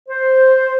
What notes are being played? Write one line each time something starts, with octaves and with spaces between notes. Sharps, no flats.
C5